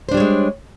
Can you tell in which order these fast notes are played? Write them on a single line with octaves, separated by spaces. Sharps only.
C5 D4 G3 C#5 G#3